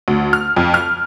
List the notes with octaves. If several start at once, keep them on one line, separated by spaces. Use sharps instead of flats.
D2
F6
F2
F6